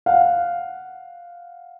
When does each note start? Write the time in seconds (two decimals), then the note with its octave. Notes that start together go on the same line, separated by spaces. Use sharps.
0.06 F5 F#5